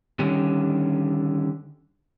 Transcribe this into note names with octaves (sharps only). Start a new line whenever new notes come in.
D3 D#3 G3 C#4